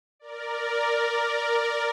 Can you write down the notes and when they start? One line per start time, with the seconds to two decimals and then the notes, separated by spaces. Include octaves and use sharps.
0.20 A#4 D5